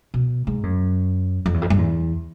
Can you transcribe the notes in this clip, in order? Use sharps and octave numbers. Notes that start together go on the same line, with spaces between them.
B2
G#2
F#2
F2
E2
F2
G2
E2